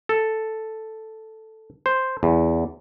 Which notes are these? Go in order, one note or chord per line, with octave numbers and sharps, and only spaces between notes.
A4
C5
E2